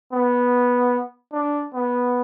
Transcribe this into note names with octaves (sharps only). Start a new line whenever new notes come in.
B3
D4
B3